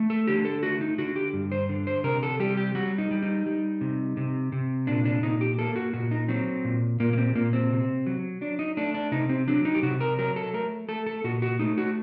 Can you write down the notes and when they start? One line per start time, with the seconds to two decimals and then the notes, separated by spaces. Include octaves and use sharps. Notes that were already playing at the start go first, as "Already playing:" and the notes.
Already playing: A3
0.10 A4
0.27 D3 G4
0.45 A4
0.63 A3 F#4
0.81 D#4
0.98 D3 F#4
1.16 G4
1.33 G2
1.52 C5
1.69 D3
1.87 C5
2.04 C3 A#4
2.23 A4
2.40 G3 G4
2.57 G4
2.75 G3 F#4
2.98 D#4
3.11 G3
3.23 D#4
3.46 G3
3.81 C3
4.17 C3
4.52 C3
4.87 A#2 D4
5.05 D4
5.23 A#2 D#4
5.41 G4
5.59 A#3 A4
5.76 F#4
5.94 A#2 F#4
6.11 D#4
6.29 F#3 C4
6.65 A#2
7.00 A#2 A#3
7.13 A#3
7.17 C4
7.35 A#2 A#3
7.53 C4
7.70 C3
8.06 F#3
8.41 F#3 D4
8.59 D#4
8.77 A3 D4
8.94 D4
9.12 C3 D#4
9.29 C4
9.48 F#3 D4
9.65 D#4
9.74 G4
9.83 C3 F#4
10.01 A#4
10.18 F#3 A#4
10.36 A4
10.54 A3 A#4
10.89 A3 A4
11.07 A4
11.24 A#2 F#4
11.42 F#4
11.59 A3 D#4
11.78 F#4